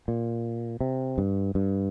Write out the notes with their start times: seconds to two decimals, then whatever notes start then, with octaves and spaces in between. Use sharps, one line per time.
0.08 A#2
0.81 C3
1.18 G2
1.55 G2